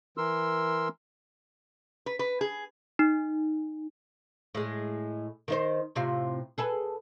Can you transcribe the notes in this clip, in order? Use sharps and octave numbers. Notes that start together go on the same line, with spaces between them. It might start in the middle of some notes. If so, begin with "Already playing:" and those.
E3 A#4 C6 E6
B4
B4
G#4
D#4
A2 G#3
D#3 D#4 C5
A2 C3 F4
G#4 A4 B4